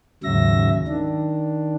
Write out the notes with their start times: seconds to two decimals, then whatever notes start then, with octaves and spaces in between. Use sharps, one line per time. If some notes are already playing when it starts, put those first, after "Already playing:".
0.24 D#2 G#2 C#3 F#3 E5 A#6
0.88 D#3 D4